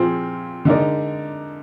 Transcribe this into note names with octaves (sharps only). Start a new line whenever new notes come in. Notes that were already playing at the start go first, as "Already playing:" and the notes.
Already playing: A#2 F3 C4 F4 G#4
D3 G#3 D#4 A#4 D5